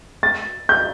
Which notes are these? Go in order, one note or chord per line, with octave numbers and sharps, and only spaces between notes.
A6
G6